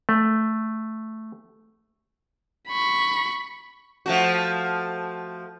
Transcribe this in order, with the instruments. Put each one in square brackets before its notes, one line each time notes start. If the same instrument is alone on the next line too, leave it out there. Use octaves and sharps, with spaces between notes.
[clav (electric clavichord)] A3
[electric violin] B5 C#6
[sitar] F3 A3 F#4